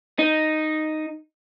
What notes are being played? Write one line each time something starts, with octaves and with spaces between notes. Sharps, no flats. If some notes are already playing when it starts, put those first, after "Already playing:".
D#4